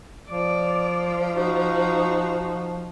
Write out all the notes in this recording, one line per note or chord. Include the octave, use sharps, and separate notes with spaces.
F3 D5
D#4 F#4